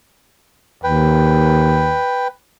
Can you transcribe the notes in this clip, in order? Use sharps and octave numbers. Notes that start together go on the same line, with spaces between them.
D#2 B4 G5